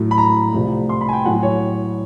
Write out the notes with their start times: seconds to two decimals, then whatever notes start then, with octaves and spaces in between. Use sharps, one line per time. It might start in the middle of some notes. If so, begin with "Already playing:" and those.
Already playing: A2 F#3 A3
0.11 B5
0.18 A#5
0.53 C2 C3 F3 A3
0.89 C6
1.01 B5
1.09 G#5
1.13 G5
1.25 A2 F#3 A3 F#5
1.43 C#5